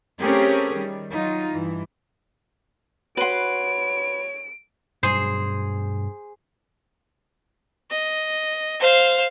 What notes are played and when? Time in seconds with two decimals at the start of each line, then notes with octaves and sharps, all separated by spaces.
0.21 A3 C4 C#4 G4 G#4 A#4
0.74 D#3 G3
1.12 F#3 D#4 F4
1.50 G2 E3
3.17 F#4 B4 C#5 F#5 C6 D7
5.03 G2 B2 F#3 G#4 C5
7.90 D#5
8.80 C5 F5